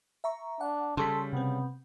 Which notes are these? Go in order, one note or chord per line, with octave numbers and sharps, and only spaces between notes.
E5 A#5 C#6
D4 F#5
C#3 G3 A4 C6 C#6 B6
C3 B3 C4